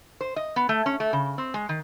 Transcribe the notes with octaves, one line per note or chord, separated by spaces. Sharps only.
C5
D#5
B3
A3
C#4
A3
C#3
C4
G#3
D#3